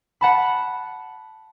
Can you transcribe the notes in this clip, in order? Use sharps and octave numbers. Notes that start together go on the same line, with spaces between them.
F#5 A5 B5